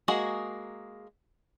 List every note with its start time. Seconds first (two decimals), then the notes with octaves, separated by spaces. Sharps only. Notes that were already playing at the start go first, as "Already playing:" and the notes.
0.08 G#3 A#3 F#4 G#4